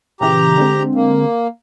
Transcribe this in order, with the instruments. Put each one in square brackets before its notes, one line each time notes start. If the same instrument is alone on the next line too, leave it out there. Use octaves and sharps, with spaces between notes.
[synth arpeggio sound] A#2 C#3 E3 [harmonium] G4 A#5
[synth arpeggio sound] D3 G#3 C4
[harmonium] A#3